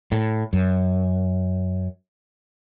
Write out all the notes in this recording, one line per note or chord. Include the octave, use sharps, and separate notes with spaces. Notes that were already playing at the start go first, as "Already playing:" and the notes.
A2
F#2